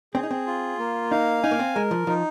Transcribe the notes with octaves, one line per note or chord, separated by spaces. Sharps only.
C4 G#4
D#4
C4
F4
A#3
D#4 F5
D#4 G#5
A#3
C4
G#3 A#4
F3
F3 D#4